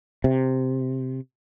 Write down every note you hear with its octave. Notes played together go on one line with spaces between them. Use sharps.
C3